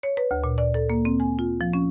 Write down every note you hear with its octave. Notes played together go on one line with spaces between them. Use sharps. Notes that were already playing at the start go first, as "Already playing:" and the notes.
C#5
B4
D2
A#2
D5
A4
A#3
C4
G#5
F4
F3
C#4